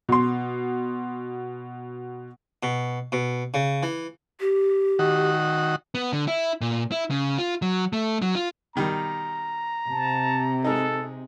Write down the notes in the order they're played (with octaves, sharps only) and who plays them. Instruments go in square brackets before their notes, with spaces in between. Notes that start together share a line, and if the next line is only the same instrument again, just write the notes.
[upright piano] B2 C6
[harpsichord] B2
B2
C#3
E3
[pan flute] G4
[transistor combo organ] D#3 F#4
[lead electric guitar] B3
D3
E4
A#2
E4
C#3
F4
F#3
A3
F#3
F4
[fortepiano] B2 D#3 G3 [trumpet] A#5
[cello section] C3 [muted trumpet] A5
[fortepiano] G#3 D#4 [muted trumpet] A4